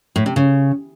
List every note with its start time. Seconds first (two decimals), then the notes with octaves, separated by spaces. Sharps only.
0.16 A2
0.26 C3
0.36 C#3